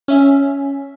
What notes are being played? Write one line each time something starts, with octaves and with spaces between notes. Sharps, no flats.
C#4 E5